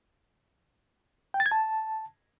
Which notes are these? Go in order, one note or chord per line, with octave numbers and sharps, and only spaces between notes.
G5
A6
G#6
A5